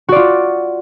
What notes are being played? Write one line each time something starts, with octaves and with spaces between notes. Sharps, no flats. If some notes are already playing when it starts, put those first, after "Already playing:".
F4 F#4 D5